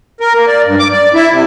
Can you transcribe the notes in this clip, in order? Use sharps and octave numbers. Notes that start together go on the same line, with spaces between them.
A#4
A#3
D5
G2
D6
D5
E4
C3